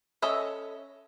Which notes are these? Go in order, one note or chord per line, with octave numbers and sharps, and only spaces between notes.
C#4 A4 D#5 E5